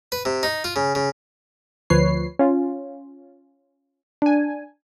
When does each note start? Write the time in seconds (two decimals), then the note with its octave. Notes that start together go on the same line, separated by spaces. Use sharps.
0.12 B4
0.25 C3
0.43 D#4
0.64 F4
0.76 C#3
0.95 C#3
1.90 D2 F3 B4 C#5 C7
2.39 C#4 F4
4.22 D4 G#5